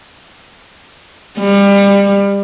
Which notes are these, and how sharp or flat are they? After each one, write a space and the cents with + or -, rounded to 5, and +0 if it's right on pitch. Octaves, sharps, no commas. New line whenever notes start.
G3 +30